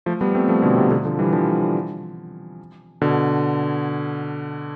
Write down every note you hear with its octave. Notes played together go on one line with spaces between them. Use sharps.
F3 A3
G3 B3
A3 C4
F3 A3
B2 D3
C3
B2 D3
D3 F3
E3 G3
D3 F3
B2 D3